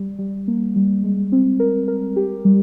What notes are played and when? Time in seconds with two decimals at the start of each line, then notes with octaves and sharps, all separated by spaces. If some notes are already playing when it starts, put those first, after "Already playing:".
Already playing: G3
0.19 G3
0.48 A#3
0.76 G3
1.04 G#3
1.32 C4
1.60 A#4
1.88 A#4
2.16 G4
2.45 G3